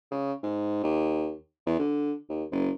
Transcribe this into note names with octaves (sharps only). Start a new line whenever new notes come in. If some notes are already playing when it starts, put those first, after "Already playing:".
C#3
G#2
D#2
E2
D3
D#2
F#1